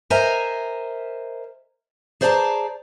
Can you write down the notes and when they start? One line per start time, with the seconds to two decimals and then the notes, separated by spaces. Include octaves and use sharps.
0.10 A#4 C5 D#5 E5 G#5 A#5
2.21 G#4 C5 D5 F5 A5 A#5